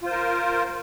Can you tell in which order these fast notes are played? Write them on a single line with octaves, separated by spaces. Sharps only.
F4 C5 A#4